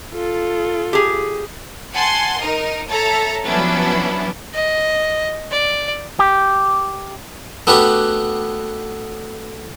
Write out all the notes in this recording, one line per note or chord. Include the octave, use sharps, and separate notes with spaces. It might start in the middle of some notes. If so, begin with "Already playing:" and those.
F4 A4
G4 G#4
F#5 G#5 A5 C6
D#4 A#4 D#5
A4 C#5 E5 A5 A#5
F3 F#3 B3 C#4 D4 E4
D#5
D5
G4
A3 B3 D4 F#4 G4 B4